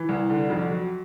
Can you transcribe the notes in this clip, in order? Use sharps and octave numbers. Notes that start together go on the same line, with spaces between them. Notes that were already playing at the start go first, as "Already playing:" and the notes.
Already playing: E3
C2
D3
F2
F#3